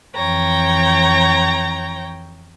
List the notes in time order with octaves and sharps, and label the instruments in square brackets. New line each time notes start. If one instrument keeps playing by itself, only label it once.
[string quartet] F2 E3 C#5 G5 A#5